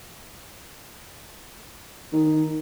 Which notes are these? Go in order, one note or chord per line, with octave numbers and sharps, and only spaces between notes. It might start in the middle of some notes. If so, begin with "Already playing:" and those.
D#3